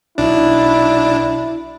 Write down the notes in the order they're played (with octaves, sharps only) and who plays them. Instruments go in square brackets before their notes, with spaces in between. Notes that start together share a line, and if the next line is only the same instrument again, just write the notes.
[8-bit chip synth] B1 D4 [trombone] E4